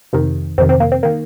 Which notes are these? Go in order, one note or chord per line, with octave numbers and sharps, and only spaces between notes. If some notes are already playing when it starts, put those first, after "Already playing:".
F2 C3 D#3
F2 C3 D#3 C4
C4
A#3
C4
D#3 A#3